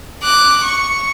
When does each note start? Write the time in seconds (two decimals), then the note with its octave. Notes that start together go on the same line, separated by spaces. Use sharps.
0.23 D6 F#6
0.63 C#6